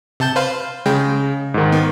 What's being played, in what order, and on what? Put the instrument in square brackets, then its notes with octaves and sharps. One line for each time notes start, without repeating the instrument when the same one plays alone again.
[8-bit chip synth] C3 A5 G6
B4 C5 F5
[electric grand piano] C#3 [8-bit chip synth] G#3 G5
[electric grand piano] G#2 D#3
[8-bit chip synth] B3